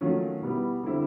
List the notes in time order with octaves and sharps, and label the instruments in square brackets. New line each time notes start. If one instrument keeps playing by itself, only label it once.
[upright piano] D#3 F#3 A3 C#4 F4
B2 G3 B3 E4
D3 G3 C4 E4